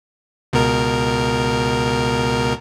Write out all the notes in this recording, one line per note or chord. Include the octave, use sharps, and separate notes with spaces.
C#2 B2 A#4